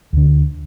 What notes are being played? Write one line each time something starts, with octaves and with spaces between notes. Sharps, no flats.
D2 D3